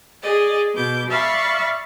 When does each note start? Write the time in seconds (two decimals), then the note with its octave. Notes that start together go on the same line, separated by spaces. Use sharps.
0.22 G#4 D5 D#5
0.74 B2 D6 G6
1.09 D5 E5 F5 B5 C#6